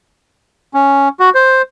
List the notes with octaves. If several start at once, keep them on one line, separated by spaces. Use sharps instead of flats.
C#4
F#4
C5